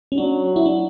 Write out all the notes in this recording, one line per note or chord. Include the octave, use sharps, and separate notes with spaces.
C#4
F#3 D4
E4
D4